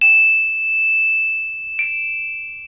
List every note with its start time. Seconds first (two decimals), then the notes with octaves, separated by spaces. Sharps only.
0.01 E7
1.79 D7